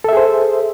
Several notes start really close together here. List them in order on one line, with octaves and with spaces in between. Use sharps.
A4 E5 G#4 C5